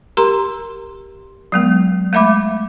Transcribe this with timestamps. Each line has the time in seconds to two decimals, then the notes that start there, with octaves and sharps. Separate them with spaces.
0.17 G4 A#4 A#5 C6
1.52 F#3 G#3 B3
2.13 G#3 A3 E5 B5 D6